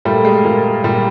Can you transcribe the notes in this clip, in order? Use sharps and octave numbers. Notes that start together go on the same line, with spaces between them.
A#2 G3 A3
G#3
A#2
A#2 G3